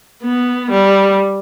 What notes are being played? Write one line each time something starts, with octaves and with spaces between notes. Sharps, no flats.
B3
G3